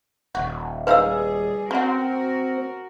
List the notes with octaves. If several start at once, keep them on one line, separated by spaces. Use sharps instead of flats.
D#1 F#4
G3 G#3 D#4 G#4 B4 F5 E6
C4 C#4 F#4 A#4 F#5